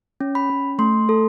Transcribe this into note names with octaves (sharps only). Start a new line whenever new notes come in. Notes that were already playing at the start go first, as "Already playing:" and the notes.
C#4
B5
C#4
A3 C6
A4